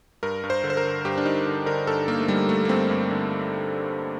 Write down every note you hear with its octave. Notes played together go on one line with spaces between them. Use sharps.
G2 A#4
G2
C5
D3
C5
A#4
D3
G2 G4
D4
G2 D#4
D3
D3 A#4
G2 A4
G2 A#3
A3
D3 G3
D3 A3
A#3
G2 C4
G2
D3